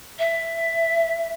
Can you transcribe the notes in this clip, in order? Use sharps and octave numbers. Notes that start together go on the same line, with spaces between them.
E5